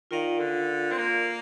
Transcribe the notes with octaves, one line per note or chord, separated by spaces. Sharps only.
D#3 F4 A#4 D5 F5
D3
C4
A#3